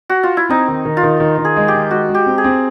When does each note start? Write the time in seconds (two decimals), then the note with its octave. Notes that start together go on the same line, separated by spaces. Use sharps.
0.10 F#4
0.23 F4
0.37 E4
0.49 C4 D#4
0.68 D#3
0.85 D#3
0.97 F4
1.03 D#3
1.20 D#3
1.38 D#3
1.45 G#4
1.56 G#3
1.68 G4
1.73 D#3
1.90 G#3 F#4
2.09 G#3
2.14 G4
2.26 C4
2.38 G#4
2.44 C4